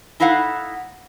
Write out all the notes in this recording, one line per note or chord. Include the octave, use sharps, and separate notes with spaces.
D#4 E4 A4 F5 F#5